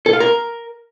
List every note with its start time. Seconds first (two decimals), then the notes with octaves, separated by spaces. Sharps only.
0.06 A4
0.13 F5
0.20 A#4